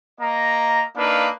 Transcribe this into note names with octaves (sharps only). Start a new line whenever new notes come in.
A#3 D#5 A#5
A#3 D4 D#4 B4 F5